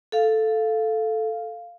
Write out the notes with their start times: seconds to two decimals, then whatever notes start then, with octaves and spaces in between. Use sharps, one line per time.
0.12 A4 F5